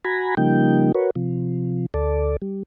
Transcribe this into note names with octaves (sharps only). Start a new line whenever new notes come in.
F#4 G#5 A#5 B5
C#3 F3 G3 A#3 D#4 G5
F#4 A#4 B4 C#5
C3 F3
D2 A4 D5
G3